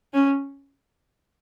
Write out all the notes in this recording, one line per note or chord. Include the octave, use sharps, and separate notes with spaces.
C#4